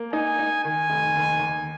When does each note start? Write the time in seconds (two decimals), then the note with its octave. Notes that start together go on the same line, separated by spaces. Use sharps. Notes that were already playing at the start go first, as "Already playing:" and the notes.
Already playing: A#3
0.13 D#4 G#5
0.39 D#4
0.64 D#3 G#5
0.90 F1
1.15 D#2
1.39 D#2